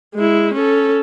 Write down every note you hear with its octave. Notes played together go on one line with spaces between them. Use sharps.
G#3 E4
C#4 A4